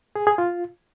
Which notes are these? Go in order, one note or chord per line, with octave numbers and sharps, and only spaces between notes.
G#4
G#4
F4